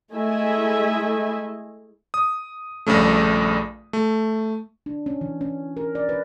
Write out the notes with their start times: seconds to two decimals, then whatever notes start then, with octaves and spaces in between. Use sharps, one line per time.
0.13 G#3 A3 E4 D#5 E5 G#5
2.14 D#6
2.86 A#1 G2 C#3 A3
3.93 A3
4.86 D4
5.06 C#4
5.21 E3
5.41 C#4
5.77 A#4
5.95 D5
6.09 B4